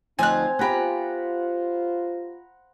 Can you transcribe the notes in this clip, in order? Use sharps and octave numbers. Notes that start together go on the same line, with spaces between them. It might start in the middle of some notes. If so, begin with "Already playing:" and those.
D2 F3 C4 D#4 F5 G#5 F#6
B3 F4 G4 C5 F#5 A#5 B5